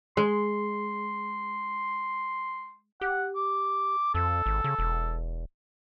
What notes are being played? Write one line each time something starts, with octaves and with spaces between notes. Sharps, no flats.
G#3 C6
G4 F#5
D6
F2 A4
G#1
C#3
E1